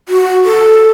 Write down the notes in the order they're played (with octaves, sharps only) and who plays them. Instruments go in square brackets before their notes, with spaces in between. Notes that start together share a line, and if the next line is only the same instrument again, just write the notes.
[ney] F#4
A4